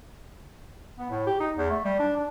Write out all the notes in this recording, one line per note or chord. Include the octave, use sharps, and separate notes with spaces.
B3
A2
G4
D#4
E2
A3
G3
D4
D4